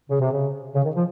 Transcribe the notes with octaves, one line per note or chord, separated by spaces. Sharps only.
C#3
C3
C#3
C#3
D#3
F3